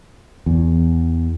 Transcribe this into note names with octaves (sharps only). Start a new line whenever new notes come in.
E2